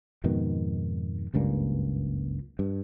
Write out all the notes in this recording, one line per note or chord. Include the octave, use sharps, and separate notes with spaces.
F2 G#2 B2 D#3
F#1 C#2 G2 A#2
G2